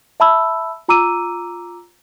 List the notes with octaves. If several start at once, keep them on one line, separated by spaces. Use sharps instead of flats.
E5 A5 B5 E6
F4 A#5 D6 E6 D#7